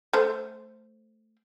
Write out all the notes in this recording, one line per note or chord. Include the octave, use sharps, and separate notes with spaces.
A3 C5